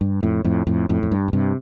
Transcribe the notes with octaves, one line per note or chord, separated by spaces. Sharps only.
G2
F2 A2
F2 A2
F2 A2
F2 A2
F2
G2
A2
G2 C3